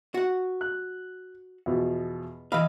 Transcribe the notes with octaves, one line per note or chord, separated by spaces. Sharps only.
F#4 F#5
F#6
E2 B2 F3
E3 D#5 F5 B5 E6